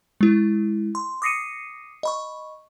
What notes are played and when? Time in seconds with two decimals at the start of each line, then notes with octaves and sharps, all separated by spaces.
0.21 G#3 E4
0.95 C6
1.22 D6 D#6 A#6 C7 C#7 D#7
2.03 D#5 B5 C#6